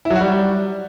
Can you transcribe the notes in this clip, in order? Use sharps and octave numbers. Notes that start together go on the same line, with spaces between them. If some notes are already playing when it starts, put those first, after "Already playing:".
E4
F#3
F#4
G3